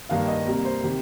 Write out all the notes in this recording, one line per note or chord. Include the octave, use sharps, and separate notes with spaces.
G2 D#3 G3 A#3 F5
D#5
C3 G3 A#3
C5
C3 D#3 G4